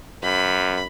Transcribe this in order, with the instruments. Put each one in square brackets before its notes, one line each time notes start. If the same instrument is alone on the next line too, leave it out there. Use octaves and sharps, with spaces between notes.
[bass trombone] F#2 [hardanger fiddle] B5